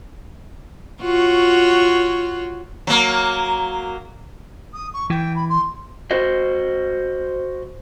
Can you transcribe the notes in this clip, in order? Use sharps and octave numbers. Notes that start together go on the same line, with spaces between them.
F4 F#4 C#5
F#3 A#3
D#6
C#6
E3 G5
B5
C6
F#4 C5 D#5